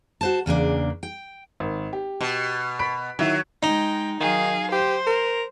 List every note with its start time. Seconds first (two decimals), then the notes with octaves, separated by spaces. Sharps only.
0.21 F#4 C5 A5
0.46 E2 C#3 A#3 D4
1.03 G5
1.60 G#1
1.93 G4
2.21 B2
2.79 B5 B6 D7
3.19 D#3 F#3 E4
3.63 G#3 D#4 G5
4.20 D#3 F#3 G#4 F5
4.72 G4 C5
5.07 A#4